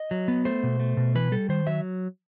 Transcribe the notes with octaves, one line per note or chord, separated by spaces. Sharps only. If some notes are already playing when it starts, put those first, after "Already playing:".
Already playing: D#5
F#3
B3
A3 C5
B2
A3
B2
E3 B4
G3 A4
D#3 C5
F#3 E5